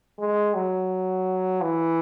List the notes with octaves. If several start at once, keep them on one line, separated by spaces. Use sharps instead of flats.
G#3
F#3
E3